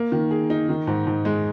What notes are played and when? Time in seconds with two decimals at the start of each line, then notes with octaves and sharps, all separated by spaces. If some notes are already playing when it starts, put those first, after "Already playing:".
Already playing: A#3
0.12 D#3
0.31 G#4
0.50 D#4
0.69 D#3
0.87 G#2
1.07 G#2
1.25 G#3